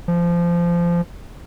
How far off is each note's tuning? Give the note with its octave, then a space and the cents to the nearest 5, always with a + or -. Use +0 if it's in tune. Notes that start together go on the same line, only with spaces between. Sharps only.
F3 -20